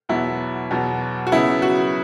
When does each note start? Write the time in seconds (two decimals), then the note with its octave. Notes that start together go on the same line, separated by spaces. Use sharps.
0.09 E2 B2 F#3 B3 E4
0.71 E2 B2 F#3 B3
1.27 F#4
1.32 C#3 F#3 B3 E4
1.62 F#4